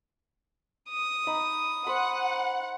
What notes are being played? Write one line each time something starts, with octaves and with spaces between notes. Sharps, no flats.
D#6
D#4 B5
C5 F#5 B5